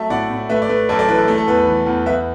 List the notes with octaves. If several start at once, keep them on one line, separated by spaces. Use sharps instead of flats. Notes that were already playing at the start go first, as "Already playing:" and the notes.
Already playing: F#3 A3 E5 A5
A2 D5 F#5
A2
A3 B4 E5
D5
A3 B4
F#2 A4 D5
A4 D5
E3 B4
A4
A3
A4
E2 B4
B4
E3
E2
E2 B4 E5